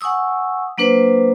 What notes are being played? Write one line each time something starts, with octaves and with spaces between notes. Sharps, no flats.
F#5 G#5 C#6 D#6 E6
F#3 A#3 D4 B4 C5